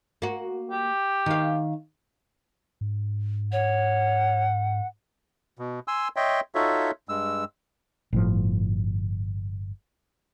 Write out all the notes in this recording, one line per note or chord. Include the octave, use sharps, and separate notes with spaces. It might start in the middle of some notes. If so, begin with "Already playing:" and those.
A#3 F#4
G4
D#3 F5
G#2
C#5 F#5
B2
G#5 C6 E6
C#5 D#5 E5 G5 C6
D#4 F4 F#4 A4 C#5 E5
G2 G#3 E6
G1 A2 F3